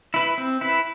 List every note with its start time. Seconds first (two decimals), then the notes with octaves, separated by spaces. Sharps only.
0.14 E4 B4
0.38 C4
0.61 E4 B4